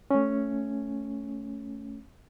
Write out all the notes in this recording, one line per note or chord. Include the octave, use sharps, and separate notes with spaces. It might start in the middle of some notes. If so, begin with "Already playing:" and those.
A3 C#4